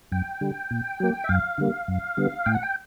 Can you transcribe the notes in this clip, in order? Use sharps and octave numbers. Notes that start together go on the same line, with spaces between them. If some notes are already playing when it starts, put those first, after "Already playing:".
F#2 G5
D3 G3
A#2
F#3 A#3
E5
F#2 F5
D3 G3 A#3
F#2
D3 G3 B3
A2 G5
F#5
G5